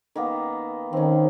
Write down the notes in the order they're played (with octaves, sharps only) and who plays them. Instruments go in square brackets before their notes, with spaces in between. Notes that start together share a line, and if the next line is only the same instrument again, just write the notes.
[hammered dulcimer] D#3 A#3 B3
[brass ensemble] D#3 [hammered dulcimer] C4 C#4